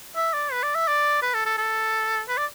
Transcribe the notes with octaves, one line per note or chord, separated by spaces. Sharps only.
E5
D5
B4
D5
E5
D5
B4
A4
A4
A4
B4
D5